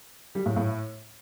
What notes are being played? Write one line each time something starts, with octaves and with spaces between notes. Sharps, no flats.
G3
A2
A2